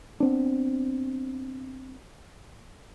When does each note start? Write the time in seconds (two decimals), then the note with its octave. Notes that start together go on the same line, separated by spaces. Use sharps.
0.20 B3 C4 D4